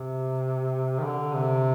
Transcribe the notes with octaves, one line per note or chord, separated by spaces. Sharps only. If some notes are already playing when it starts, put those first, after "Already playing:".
Already playing: C3
D#3
D3
C3